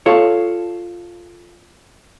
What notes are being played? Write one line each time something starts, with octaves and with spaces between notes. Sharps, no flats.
F4 A4 C#5